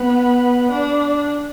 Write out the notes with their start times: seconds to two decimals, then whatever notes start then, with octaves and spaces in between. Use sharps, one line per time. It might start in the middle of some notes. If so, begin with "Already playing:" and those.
Already playing: B3
0.71 D4